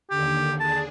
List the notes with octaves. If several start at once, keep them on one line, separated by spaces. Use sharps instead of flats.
D#2 D3 G4
D4 G#4 A5